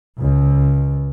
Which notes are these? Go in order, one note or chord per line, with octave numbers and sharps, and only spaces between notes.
C#2